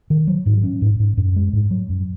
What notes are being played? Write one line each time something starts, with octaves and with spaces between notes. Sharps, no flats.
D#3
F#3
G#2
C#4
G#2
G#2
F#2
G#3
G#2
F#3
F#2